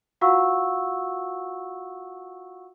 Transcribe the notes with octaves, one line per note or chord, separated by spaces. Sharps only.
F4 F#4 F5 F#5 C#6 E6